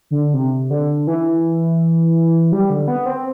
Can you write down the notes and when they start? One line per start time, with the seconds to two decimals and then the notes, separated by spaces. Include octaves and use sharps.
0.11 D3
0.34 C3
0.70 D3
1.07 E3
2.52 G3
2.70 D3
2.88 B3
3.06 C4